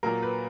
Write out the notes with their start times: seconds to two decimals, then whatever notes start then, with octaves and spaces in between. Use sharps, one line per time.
0.03 A#2 F#3 A#3 A#4
0.22 B4